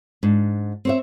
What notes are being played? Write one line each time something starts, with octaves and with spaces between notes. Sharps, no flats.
G#2 D4
C4 C#5 E5